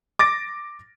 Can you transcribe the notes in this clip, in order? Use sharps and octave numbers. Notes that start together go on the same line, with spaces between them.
D6 A6 A#6 D7